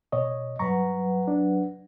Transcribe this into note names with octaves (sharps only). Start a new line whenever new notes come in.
B2 C#5 D#5
G2 F#3 B4 F#5 A#5 C#6
D4